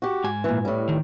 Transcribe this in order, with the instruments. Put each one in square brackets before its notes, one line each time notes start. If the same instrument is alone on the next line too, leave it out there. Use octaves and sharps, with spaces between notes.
[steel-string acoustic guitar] F#4 G4
[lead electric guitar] G#2 G#5
[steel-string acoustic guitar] A#2 E3
A2 G3
[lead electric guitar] D#3